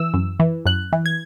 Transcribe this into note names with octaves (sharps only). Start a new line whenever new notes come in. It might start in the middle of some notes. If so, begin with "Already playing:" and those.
Already playing: E3 E6
F#2
E3
F#2 F#6
E3
G#6